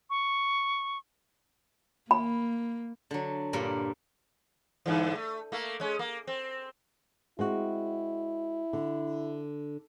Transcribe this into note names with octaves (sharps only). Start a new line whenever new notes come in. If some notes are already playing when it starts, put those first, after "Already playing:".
C#6
A#3 B5
D3 F#3
G2 A#2 A#4 B5
G2 D3 E3
A3
A3 A#3
G#3 C#4
A#3
C4
G#3 C4 E4 F#4
D3